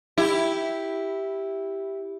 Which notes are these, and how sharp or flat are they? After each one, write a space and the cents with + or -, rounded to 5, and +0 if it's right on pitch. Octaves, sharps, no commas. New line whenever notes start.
E4 -5 G4 +0